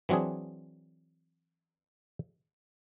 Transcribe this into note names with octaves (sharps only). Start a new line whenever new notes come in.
E3 F#3 C4 D4 G#4